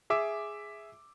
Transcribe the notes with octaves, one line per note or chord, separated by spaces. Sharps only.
G#4 E5 D6 E6